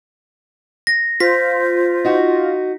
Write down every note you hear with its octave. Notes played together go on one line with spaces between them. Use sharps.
A#6
F4 C5 B6
D#4 F#4